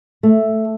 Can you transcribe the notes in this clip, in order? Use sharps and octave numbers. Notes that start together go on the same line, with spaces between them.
A3